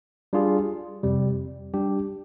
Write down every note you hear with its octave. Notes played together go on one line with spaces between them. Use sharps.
G3 D4 F4 G#4
F2 C3 G3
G3 D4 G4